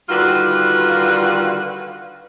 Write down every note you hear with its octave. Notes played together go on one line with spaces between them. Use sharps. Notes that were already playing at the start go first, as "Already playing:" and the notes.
D3 D#3 G3 F4 F#4 B4